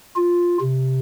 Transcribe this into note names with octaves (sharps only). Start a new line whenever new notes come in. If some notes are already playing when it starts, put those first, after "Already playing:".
F4
C3